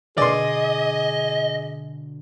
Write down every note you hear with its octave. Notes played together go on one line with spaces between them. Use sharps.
B2 D3 G#4 D5 D#5 C6